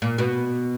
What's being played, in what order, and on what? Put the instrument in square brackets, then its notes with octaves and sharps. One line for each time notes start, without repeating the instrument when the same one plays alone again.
[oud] A#2
B2